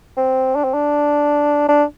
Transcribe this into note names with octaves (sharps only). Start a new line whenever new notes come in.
C4
D4
C4
D4
D4